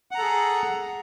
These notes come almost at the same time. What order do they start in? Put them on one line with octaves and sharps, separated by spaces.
F#5 A#5 A4 G#4